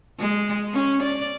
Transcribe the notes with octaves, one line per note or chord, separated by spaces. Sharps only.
G#3
C#4
D5